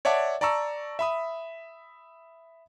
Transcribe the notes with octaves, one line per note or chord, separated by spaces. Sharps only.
C#5 D5 E5 F#5 A5 D6
D5 A5 A#5 C#6 E6
E5 B5 D#6